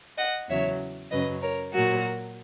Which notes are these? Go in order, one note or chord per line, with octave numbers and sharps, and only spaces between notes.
D#5 F#5
E2 C#3 F#3 C#5 E5
F#2 C#3 F#3 B4 D#5
A#4 C#5
A#2 F#3 F#4 A#4